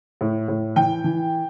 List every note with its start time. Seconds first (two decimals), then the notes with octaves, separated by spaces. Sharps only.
0.21 A2
0.48 A2
0.76 E3 G5
1.04 E3